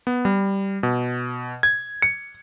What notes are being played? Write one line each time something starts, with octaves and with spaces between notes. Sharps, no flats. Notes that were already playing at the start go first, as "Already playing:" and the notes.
B3
G3
B2
G#6
C#7